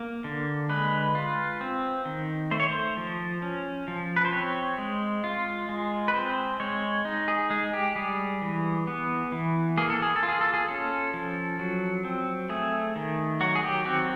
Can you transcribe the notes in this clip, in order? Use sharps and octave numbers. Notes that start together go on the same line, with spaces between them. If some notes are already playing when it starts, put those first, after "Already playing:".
Already playing: A#3
D3
G#3 B4
F4
C4
D#3
A3 C5
C#5
C5
F3
C#4
F3
B4
C5
C4 C#5
G#3
F4
G#3
B4
C4 C5
G#3 C#5
D#4
G#4
G#3 G#4
G4
G3 G#4
E3
B3
E3
A#3 G#4
A4
G#4
A4
F4
G#4
A4
G#4
C#4 A4
F3
F#3
C4
A3 G#4
D#3
F#3 F#4
G#4
G4
C4 F#4